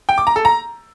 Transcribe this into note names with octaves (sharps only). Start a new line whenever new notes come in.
G5
D6
A#5
A4
A#5